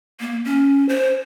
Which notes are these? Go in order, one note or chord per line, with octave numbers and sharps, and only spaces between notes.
A#3
C#4
C5